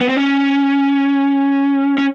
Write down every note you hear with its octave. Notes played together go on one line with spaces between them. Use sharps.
B3
C4
C#4
C#4